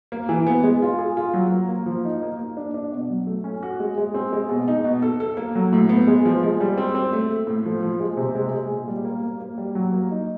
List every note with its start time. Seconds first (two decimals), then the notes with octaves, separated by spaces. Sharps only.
0.12 A#3
0.29 E3
0.47 B3
0.63 G#3
0.82 F4
0.99 G#4
1.17 F4
1.34 F#3
1.52 A#3
1.69 A#3
1.86 F3
2.05 D#4
2.22 A#3
2.39 A#3
2.57 D4
2.74 D4
2.92 B2
3.10 F#3
3.27 A3
3.44 C#4
3.63 F#4
3.80 G#3
3.98 G#3
4.14 C4
4.33 G#3
4.49 B2
4.68 D#4
4.84 B2
5.02 A4
5.20 A4
5.37 A#3
5.55 F#3
5.73 A2
5.89 B3
6.07 G#3
6.25 F3
6.43 G#3
6.60 G3
6.78 C4
6.95 C4
7.13 A3
7.30 A3
7.47 A2
7.66 F3
7.82 F3
8.00 G#3
8.17 C3
8.35 G#3
8.52 G#3
8.70 A#2
8.88 G3
9.05 A#3
9.23 A#3
9.40 A#3
9.58 G3
9.75 F#3
9.93 A#3
10.11 D#4